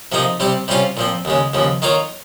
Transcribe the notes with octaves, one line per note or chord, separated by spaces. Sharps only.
C3 F3 A#3 D#4
C3 G3 C4 G4
C3 G3 C#4 F4 C5
A#2 F3 C4
D#2 C#3 G#3
D#2 C#3 F3
D#3 A#3 F4 A#4 C#5